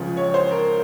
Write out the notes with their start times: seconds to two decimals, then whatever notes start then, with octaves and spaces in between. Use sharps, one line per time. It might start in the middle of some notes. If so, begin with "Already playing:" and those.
Already playing: C#2 C#3 F3
0.17 C#5
0.34 C5
0.51 A#4